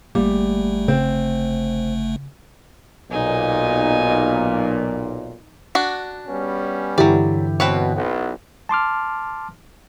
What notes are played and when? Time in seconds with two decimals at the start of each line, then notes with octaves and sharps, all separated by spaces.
0.15 G1 G3 A3 A#3
0.88 C#3 C4
3.11 B1 A#2 D#4 G#5
5.75 D4 F#4
6.27 G3 B3 C#4
6.98 G2 D3 E3 F#3 E4 G4 D5
7.60 B2 C4 B4 C#5
7.95 B1 B3
8.69 A5 C6 D6 F6